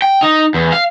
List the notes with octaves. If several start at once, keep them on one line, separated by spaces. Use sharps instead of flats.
G5
D#4
E2
F5